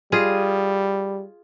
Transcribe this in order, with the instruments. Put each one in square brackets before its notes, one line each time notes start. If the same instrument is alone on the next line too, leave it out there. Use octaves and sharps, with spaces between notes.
[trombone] G3 [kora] F4 G#4 D#5